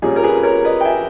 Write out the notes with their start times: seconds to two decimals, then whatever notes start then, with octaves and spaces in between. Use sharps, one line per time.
0.02 A#2 G3 C#4 G#4
0.16 A#4
0.23 G#4 B4
0.43 A#4 C#5
0.65 B4 D#5
0.81 G5
0.85 E5 G#5